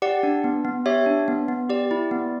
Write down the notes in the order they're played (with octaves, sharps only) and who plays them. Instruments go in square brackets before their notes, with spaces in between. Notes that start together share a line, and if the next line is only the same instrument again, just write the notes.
[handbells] G4 D5 F#5
D4
B3
B3
G4 C#5 E5
D4
B3
B3
G4 D5
E4
B3